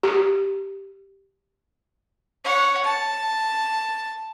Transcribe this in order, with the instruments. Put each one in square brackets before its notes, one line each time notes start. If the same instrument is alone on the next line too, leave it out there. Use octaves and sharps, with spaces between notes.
[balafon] G4
[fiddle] C#5 F#5
A5